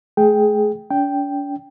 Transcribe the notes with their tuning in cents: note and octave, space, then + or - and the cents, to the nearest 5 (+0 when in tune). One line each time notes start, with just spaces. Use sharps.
A3 -35 G#4 +15 G5 +0
D4 -45 G5 +0